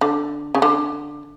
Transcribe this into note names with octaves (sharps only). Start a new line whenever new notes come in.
D3
C#3
D3